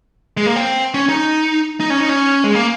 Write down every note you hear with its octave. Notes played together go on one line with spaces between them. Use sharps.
G#3
A#3
C4
C#4
D#4
D#4
C#4
D#4
C#4
G#3
A#3